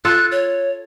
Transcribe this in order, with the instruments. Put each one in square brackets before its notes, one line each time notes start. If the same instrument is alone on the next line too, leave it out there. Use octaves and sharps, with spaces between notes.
[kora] F4 A4 [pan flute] F#6
[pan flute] C#5